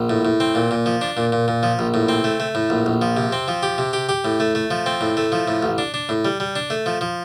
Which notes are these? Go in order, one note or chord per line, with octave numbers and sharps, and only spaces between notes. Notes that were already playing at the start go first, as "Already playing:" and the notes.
Already playing: A#1
A2
A2
C4
A#2
A#2
F3
D4
A#2
A#2
A#2
F3
A#1
A2
C4
A3
A3
A2
A#1
A#1
F3
C3
C4
F3
G4
C3
G4
G4
A2
A3
A3
F3
C4
A2
A3
F3
A2
A1
D4
D4
A2
G3
G3
D4
A3
F3
F3